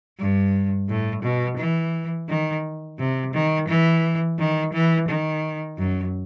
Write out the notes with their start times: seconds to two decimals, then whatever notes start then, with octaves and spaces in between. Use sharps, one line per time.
0.19 G2
0.89 A2
1.22 B2
1.57 E3
2.29 D#3
2.99 C3
3.33 D#3
3.68 E3
4.39 D#3
4.73 E3
5.09 D#3
5.78 F#2